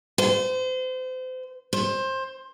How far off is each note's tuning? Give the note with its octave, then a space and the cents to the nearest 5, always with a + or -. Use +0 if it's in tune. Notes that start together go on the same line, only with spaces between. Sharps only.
C5 -35
C5 +20